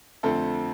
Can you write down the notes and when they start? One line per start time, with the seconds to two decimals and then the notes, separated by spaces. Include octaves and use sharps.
0.23 F2 D3 A3 C4 A4